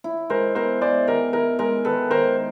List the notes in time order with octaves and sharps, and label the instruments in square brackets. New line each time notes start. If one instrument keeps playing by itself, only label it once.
[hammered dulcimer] E4
[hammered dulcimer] G#3 [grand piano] A#4 C5
[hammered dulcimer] B3 [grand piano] A#4 C5
[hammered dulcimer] G#3 [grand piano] C5 D5
[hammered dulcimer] D#3 [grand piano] A#4
[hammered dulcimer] E4 [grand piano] A#4
[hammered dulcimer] G#3 [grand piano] A#4
[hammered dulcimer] D#3 [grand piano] A4 B4
[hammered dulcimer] D#3 [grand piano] A#4 C5